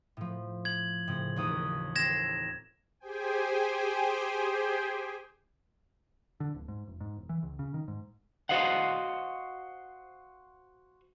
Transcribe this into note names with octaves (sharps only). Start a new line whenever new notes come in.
A2 F3
G#6 F#7
A2 C#3 C4
A1 D#2 D#6
C4 A4 G#6 A#6 C7 E7
G4 G#4 C5 G5 G#5
D3
D1
G#2
F1
G#2
E1
E3
C#2
C#3
D#3
G#2
F#4 C5 D#5 F5 F#5